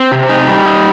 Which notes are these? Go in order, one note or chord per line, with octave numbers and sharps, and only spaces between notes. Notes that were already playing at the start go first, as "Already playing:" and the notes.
Already playing: C4
C3
D#4
G3
D#4